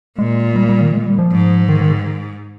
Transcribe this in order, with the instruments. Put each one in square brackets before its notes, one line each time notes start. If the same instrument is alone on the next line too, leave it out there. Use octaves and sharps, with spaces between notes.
[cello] A#2 [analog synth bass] G#3
[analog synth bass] G3
G3
D#3
G#3
G3
F3
[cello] G#2
[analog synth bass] D#3
D#3